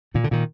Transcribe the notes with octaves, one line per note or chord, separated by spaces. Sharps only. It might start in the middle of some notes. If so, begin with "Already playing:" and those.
A#2 D#3
D3
A#2 D#3